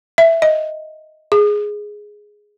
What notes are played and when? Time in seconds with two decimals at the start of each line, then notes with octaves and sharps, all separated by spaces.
0.18 E5
0.42 D#5
1.32 G#4